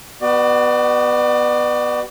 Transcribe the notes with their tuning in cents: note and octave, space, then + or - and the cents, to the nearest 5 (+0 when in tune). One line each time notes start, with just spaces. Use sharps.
B3 +0 F#4 +45 D5 +40